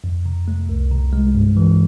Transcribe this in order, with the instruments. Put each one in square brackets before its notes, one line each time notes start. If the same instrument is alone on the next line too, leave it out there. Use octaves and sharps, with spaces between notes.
[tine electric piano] F2
C3
A3
C2
C3
G#3
G2
E3